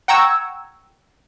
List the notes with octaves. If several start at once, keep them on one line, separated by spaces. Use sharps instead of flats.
F#5 G5 A#5 C#6 E6 G#6